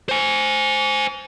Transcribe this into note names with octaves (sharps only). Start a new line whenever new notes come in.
C5 G#5